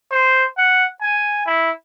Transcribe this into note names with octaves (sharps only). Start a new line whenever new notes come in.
C5
F#5
G#5
E4